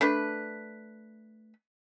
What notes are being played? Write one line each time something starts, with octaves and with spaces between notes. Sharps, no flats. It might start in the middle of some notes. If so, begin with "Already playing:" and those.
A3 D4 B4